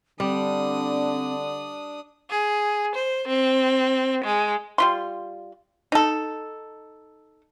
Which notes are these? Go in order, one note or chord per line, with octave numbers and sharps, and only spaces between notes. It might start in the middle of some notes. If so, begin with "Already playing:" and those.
D3 G3 C4 D4 D#6
G#4
C5
C4
G#3
G3 F4 C6
D#4 A4